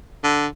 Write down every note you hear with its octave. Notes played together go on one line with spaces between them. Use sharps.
D3